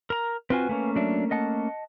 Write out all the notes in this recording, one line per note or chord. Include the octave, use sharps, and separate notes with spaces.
A#4 A#5
C4 F4 F#4 B4 F5 G#5
A3 A#3 C#4
F#3 D4 E5
D#5 F#5 A5